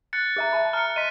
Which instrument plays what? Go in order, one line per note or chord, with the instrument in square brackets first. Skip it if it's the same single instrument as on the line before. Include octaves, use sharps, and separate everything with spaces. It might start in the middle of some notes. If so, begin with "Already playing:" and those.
[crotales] F#6 A6 C#7
[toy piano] G#4 E5 A#5
A5 B5
[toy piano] A#5 [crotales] F6 C#7
[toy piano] D#5 C6 [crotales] B6 D#7